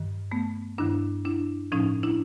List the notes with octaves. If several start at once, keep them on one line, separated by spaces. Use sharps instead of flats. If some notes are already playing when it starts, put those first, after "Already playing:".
Already playing: G2 D#3
A3 B3
G2 D#3 D4 E4
D4 E4
A2 F3 C#4 D#4
D4 E4